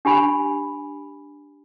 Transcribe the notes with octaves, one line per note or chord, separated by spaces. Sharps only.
D4 G4 G#5 B5